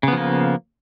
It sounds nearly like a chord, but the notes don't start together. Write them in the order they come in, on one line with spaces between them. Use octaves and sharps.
C#3 B3 F3 A#3